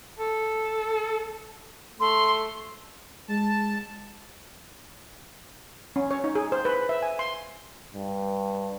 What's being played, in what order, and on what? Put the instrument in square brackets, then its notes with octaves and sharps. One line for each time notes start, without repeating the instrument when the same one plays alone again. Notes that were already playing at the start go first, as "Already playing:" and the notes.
[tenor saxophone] A4
[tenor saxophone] A3 [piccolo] C6
[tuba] G#3 [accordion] A5
[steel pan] C#4
C#5
D#4
G#4
C5
B4
E5
G#5
C6
[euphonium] G2